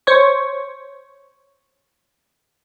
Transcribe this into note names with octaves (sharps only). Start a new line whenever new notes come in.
C5 C#5 C#6